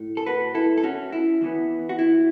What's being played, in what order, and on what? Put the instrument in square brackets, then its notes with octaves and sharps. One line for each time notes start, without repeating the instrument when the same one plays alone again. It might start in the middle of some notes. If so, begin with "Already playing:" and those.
Already playing: [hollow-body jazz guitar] A2 A3
A4
F#4 B4
E4 A4
A4
C#4 F#4
E4
E2 E3 B3
F#4
E4